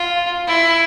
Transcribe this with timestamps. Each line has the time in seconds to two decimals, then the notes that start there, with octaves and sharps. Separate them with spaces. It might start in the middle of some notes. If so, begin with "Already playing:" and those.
Already playing: F4
0.47 E4